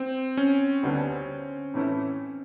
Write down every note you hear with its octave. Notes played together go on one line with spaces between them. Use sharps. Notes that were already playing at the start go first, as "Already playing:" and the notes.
Already playing: C4
C#4
D2 D3 G3 B3 D4
A2 E3 A3 C#4 E4